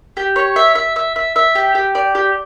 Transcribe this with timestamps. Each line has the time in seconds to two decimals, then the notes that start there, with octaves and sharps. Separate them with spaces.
0.17 G4
0.36 C#5
0.56 E5
0.75 E5
0.96 E5
1.16 E5
1.36 E5
1.55 G4
1.75 G4
1.95 D5
2.15 G4